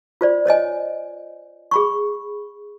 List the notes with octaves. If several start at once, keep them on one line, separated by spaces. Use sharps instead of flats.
F4 C5 D5
C5 C#5 D#5 G#5
G#4 B5 C#6